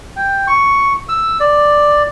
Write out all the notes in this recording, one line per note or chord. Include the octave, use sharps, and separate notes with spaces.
G5
C#6
E6
D5